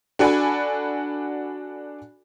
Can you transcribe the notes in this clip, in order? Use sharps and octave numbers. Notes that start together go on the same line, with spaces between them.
D4 F#4 A4 D5 G#5 B5